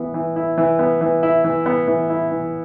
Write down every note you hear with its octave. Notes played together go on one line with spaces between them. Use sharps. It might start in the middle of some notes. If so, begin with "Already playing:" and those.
Already playing: E3 B3
E3
E4
E3
B3
E3
E4
E3
B3
E3
E4
E3